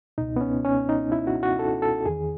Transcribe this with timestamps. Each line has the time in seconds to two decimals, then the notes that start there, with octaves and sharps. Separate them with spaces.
0.18 C#2 B2 D#4
0.36 B3
0.41 C#4
0.64 C#4
0.89 D#4
1.12 E4
1.27 F#4
1.43 F#4
1.59 A4
1.82 A4
2.05 E2 D#3 G#4